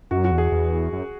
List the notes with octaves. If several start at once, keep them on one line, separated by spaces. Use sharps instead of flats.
F#2 F#4
F#4
E2
G#4
E2
F#2